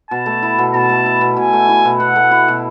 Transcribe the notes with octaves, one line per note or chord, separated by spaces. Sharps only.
B2 A5
A3
E4
B2
B2 A5
A3
E4
B2
B2 G#5
A3
E4
B2
B2 F#5
A3
E4
B2